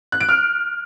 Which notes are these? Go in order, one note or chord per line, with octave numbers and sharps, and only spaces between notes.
F#6
D7
F6